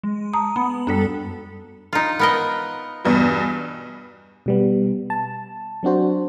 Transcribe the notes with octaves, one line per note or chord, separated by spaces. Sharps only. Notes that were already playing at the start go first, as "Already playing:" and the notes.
G#3
A5 A#5 D#6
B3 B5
F#2 G3 D4 A4
D#4 F4
B3 A#4 D#5
E2 G2 B2
B2 G3 B3
A5
F#3 C4 D4 F#4 C5